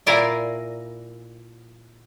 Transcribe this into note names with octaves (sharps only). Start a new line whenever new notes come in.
A#2 E4 A#4 D5 F5 G#5